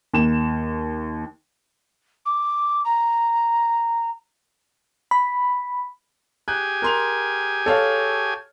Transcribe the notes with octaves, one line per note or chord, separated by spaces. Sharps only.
D#2 E7
D6
A#5
B5
G4 G#4 G#5 F#6
A#4 C6 F7
A4 C#5 F5